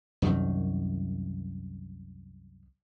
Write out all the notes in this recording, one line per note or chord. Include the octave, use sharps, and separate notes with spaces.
C2 F#2 D#3